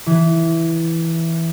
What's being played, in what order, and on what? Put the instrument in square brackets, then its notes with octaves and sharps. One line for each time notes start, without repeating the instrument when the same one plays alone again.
[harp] E3